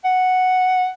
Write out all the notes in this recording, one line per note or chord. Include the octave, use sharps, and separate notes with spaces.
F#5